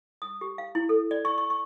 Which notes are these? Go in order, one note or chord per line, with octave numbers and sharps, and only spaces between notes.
D#6
G4
F5
E4
A4
D5
C#6
C#6
C#6